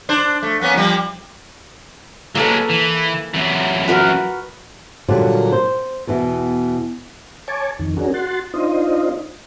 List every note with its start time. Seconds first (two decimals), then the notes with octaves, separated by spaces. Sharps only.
0.09 D4 C5
0.43 A3
0.61 A#3 B3 C#4
0.74 F3 G3
2.35 F#3 G#3 A#3 A4 B4
2.69 E3
3.34 F#2 E3
3.88 F#4 A#4 B4
5.08 A#2 D3 F#3 G3 A#3
5.52 C5
6.07 E2 B2 E3
7.48 C#5 G#5 A5 C#6 D6
7.79 F2 D#3
7.96 C#4 D4 F#4 G#4 A#4
8.14 F#4 F#5 C6 A6
8.54 D4 D#4 F4 C5 D#5